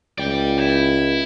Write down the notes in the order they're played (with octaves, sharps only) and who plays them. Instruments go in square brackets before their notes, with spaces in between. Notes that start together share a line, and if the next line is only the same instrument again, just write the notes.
[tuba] C#2 [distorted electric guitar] D5 G5
[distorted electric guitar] E4